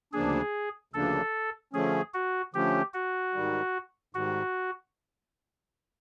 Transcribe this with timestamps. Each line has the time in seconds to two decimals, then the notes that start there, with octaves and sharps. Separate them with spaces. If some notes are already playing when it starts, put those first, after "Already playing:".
0.13 D2 C#3 F3 A#3 D4 G#4
0.93 D2 C#3 F3 A#3 D4 A4
1.73 D3 F3 A3 C#4 G#4
2.14 F#4
2.54 D3 F3 A3 C#4 G4
2.94 F#4
3.34 G#2 D#3 G3
4.15 G#2 D#3 G3 F#4